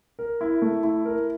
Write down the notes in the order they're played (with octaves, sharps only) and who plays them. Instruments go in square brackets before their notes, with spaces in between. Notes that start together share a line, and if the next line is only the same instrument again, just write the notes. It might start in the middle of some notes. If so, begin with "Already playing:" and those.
[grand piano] A#4
E4
A3
E4
A#4